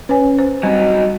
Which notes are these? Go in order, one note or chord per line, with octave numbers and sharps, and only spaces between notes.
C#4 B4 C#5 G#5
C5
F#3 G3 C4 D#4 F#4